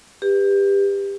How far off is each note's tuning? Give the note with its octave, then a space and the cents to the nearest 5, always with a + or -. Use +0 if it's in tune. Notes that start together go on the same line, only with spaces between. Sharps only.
G4 +20 B4 +0